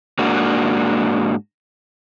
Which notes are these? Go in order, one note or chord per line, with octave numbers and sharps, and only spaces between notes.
G#2 A#3 D4 F#4